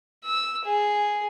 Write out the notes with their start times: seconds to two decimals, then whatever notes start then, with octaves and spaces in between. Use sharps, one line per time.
0.24 E6
0.64 G#4